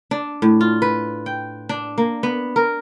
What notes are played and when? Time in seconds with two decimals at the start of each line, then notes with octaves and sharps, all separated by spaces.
0.11 D4
0.42 A2
0.61 F4
0.82 B4
1.26 G5
1.69 D4
1.98 A#3
2.23 B3
2.56 A#4